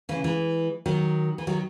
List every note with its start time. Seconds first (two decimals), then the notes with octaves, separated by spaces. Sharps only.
0.09 C#3 E3
0.24 E3 G#3
0.86 D#3 F#3
1.38 E3
1.47 D#3 F#3